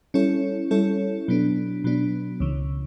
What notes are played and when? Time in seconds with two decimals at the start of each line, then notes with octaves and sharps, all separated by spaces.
0.14 G3 C#4 E4 A4 C#5
0.71 G3 C#4 E4 A4 C#5
1.28 B2 F#3 B3 D4
1.84 B2 F#3 B3 D4
2.40 C#2 C#3 E3